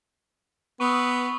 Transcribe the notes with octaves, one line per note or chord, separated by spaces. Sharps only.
B3 C#6 D#6 E6